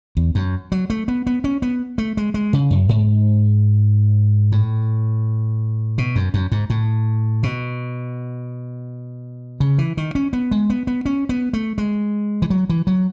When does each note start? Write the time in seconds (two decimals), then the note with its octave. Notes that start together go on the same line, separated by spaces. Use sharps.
0.17 E2
0.35 F#2
0.72 F#3
0.90 A3
1.08 B3
1.27 B3
1.44 C#4
1.62 B3
1.98 A3
2.17 G#3
2.34 G#3
2.53 C#3
2.71 F#2
2.89 G#2
4.52 A2
5.98 B2
6.16 F#2
6.34 F#2
6.52 G#2
6.70 A2
7.43 B2
9.60 C#3
9.78 E3
9.97 D#3
10.15 C#4
10.33 B3
10.51 G#3
10.70 B3
10.87 B3
11.06 C#4
11.29 B3
11.53 A3
11.78 G#3
12.42 E3
12.50 F#3
12.70 E3
12.87 F#3